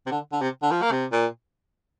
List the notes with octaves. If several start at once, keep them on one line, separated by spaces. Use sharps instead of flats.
C3
D3
D3
C3
D3
F3
A#3
C3
A#2